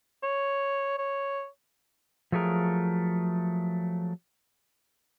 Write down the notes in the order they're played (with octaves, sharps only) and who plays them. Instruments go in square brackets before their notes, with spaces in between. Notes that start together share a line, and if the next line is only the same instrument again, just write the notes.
[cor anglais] C#5
C#5
[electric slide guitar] F3 F#3 A3 G#4 A#4